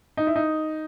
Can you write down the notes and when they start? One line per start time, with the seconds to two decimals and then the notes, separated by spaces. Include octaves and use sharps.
0.17 D#4
0.27 E4
0.36 D#4